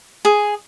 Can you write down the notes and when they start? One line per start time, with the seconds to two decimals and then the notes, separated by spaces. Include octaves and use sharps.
0.25 G#4